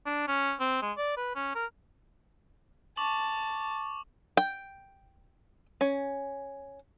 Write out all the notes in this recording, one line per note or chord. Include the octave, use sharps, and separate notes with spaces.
D4
C#4
C4
G#3
D5
B4
C#4
A#4
A5 C#6 D6 F#7
G5
C#4